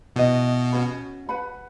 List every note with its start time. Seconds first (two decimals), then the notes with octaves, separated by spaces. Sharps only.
0.16 B2 E4 B4 D#5
0.72 C#4 F#4 B4
1.29 B4 F#5 B5